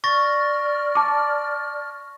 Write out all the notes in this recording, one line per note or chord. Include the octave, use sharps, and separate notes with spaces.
D5 C#6 F6 A6 A#6
A5 D6